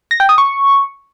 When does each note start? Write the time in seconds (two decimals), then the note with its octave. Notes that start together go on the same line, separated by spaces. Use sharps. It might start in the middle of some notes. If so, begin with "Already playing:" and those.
0.11 A#6
0.20 G5
0.29 D#6
0.38 C#6